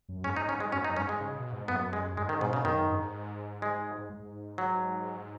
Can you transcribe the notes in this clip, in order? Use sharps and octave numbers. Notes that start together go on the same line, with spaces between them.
F#2
G#2 C#4
D#4
G#2 C#4
G#3
F#2 C#4
D#4
G#2 C#4
G#3
C#3
B2
G#2
F#2 B3
G#3
G#2 G#3
D#3
G#2 B2
C#3
F#2 D#3
G#2
G#3
G#2
F#3